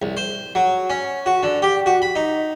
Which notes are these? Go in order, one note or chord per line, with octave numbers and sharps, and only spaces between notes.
C2
C5
F#3
C#4
F#4
D3
G4
F#4
B5
D#4